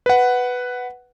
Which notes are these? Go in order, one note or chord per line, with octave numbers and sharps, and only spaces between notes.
B4 F#5